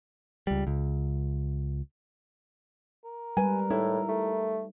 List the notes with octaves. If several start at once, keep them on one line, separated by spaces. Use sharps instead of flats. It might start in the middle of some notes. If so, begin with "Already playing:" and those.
C#2 G3
C#2
A#4
G3 G#3 B4 G#5
A2 D#4 E4
A3